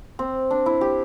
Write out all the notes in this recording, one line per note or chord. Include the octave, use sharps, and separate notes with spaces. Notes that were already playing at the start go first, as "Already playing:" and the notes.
C4
D4
E4
G4